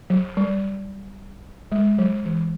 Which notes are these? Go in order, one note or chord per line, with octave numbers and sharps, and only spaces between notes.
F#3
G3
G#3
F#3
E3